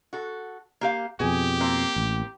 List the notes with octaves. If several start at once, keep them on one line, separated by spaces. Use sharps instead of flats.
F#4 A4
A#3 G4 F5
F2 B2 G4 G#4
A#3 C4
A1